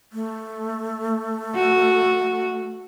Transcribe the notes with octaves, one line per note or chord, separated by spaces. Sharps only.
A3
F#4